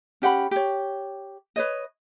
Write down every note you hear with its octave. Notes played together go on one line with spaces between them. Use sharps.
C#4 G4 F#5 B5
G4 C#5
B4 C#5 D#5